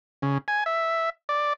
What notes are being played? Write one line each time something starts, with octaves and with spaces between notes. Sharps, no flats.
C#3
G#5
E5
D5